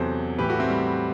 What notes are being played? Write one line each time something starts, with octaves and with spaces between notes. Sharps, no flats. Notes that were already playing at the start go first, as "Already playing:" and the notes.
Already playing: E2 C3 F#3 A4 C5
A2 E3 G4 B4
F#4 A4
C4 E4
G3